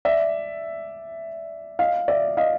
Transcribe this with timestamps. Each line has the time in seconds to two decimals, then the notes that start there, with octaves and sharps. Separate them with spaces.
0.05 D5 E5
1.79 D#5 F5
2.08 D5 E5
2.37 D#5 F5